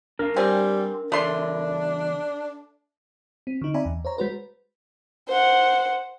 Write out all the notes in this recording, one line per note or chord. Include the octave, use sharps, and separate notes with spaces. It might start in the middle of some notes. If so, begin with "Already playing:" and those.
D4 A#4 F5
G3 C4 G#5
E2 C#3 A3 D4 D5 C6
C4
D3 D#4
C4 D5 E5 G#5 A#5 B5
E2
C5 C#5 A#5
G#3 F#4 B4 C5
C5 F#5